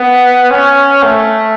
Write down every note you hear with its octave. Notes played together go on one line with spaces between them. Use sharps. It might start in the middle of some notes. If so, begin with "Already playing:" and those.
Already playing: B3
C#4
A3